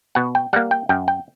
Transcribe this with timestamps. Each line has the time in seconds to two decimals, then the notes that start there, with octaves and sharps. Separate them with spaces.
0.15 B2 F#5
0.35 G5
0.53 G3 A#3 F#5
0.71 G5
0.89 F#2 G5
1.08 G5